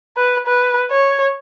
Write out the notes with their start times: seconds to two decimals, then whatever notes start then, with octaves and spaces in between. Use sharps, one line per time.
0.17 B4
0.46 B4
0.91 C#5